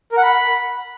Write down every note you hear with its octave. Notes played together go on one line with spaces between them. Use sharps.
A#4
F#5
B5